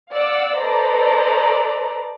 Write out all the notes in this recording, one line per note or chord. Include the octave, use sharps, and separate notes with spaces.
D5 F5 F#5 E6
A4 B4 C5 D5 D#5 A#5